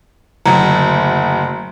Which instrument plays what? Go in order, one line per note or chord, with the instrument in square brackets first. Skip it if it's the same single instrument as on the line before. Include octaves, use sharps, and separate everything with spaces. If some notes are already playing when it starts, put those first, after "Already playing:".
[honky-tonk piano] F#1 D2 [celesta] A#5